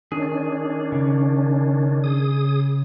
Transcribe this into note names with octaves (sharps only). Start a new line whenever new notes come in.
D#3 C#4 D4 G#4
C#3
G#4 D#6